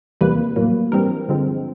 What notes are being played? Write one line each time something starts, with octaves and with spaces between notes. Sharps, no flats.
E2 C3 E3 G3 A#3 B4
A2 F#3 A#3
G2 E3 G3 C4 A#4
G2 D3 F3 G#3 C4